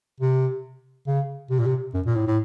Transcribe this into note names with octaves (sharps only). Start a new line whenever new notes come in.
C3
C#3
C3
A#2
C3
F#2
A#2
A2
A2